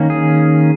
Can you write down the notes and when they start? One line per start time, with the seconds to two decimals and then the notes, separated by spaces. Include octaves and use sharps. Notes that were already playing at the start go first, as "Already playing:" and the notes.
Already playing: D#3 A#3 C#4
0.10 G#4